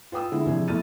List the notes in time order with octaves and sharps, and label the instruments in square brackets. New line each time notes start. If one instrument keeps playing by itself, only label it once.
[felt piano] F4 B4 G5 D#6 E6
D3 G#3 E4
A#1 C3 E3 G#4
B1 A3 E4 F6 A6 D#7